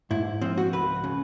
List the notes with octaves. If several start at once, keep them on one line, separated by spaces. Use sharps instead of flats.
G#2 E4
F3 C4
F#4
C#2 B4
C#3